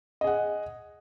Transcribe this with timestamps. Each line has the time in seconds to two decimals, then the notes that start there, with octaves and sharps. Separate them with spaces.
0.21 D#5
0.24 G#4
0.27 F#5